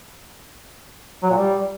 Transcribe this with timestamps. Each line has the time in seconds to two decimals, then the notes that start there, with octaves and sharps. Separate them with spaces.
1.23 F#3
1.30 A#2
1.38 G3